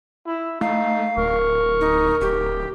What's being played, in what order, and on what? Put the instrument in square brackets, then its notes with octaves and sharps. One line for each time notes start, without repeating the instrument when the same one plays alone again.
[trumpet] E4
[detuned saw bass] A3 [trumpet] D#4 [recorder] F5
[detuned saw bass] D1 [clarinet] A#4 [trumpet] C#6
[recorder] D#4
[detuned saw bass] D1 [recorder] G4